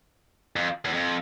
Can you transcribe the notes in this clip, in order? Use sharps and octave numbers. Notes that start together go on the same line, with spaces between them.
F2
E2
F2